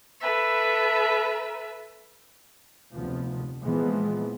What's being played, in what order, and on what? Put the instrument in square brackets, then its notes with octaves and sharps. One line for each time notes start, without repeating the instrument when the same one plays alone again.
[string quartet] A4 B4 E5
[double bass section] F1 D2 C3 F3 B3
A#2 E3 F3 G#3 B3